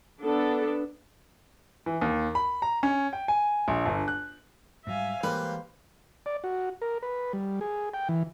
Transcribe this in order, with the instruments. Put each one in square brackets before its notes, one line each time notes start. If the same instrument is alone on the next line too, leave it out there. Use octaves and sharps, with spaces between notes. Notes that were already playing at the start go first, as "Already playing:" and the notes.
[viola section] B3 D4 A4
[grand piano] E3
D#2
B5
A#5
C#4
G5
G#5
A#1
G1
F#6
[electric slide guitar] G#2 F#3 G3 [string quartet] E5 F5 G#5
[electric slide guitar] E3 G#3 G4 [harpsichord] G3 A#3 [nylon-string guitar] B4 [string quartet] C5
[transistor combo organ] D5
F#4
A#4
B4
G3
G#4
G5
E3